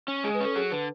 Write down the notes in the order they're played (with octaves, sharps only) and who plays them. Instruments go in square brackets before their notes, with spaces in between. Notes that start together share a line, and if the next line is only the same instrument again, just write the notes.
[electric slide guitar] C#4
[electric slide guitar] G#3 [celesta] G#4
[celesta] B4
[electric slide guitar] C#4 [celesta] A4
[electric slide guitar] F#3 [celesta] G#4
[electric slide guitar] D3 [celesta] B4